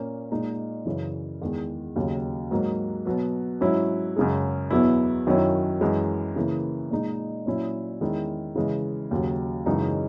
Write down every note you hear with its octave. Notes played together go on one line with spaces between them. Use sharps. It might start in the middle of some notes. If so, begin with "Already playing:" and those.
Already playing: A#2 A#3 C#4
A#2 G#3 D#4
F#2 C#3 E3
E2 D#3 G#3
D#2 C#3 F#3
G#2 F#3 A#3
B2 F#3 B3
G#2 F#3 C#4 E4
F#2 C#3 G#3
E2 B2 F#3 B3 E4
F#2 D#3 F#3 C#4 E4
F#2 E3 G#3
C#3 E3 A#3 E4
A#2 G#3 D#4
A#2 F#3 C#4 E4
E2 D#3 G#3 C#4 E4
C#3 E3 G#3
D#2 C#3 F#3
F#2 C#3 E3 G#3 D#4